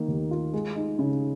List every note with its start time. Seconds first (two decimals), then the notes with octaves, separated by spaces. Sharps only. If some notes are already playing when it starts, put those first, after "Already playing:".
Already playing: D#3 A#3
0.08 D#2
0.31 F4
0.53 G#3
0.75 D#4
0.99 C#3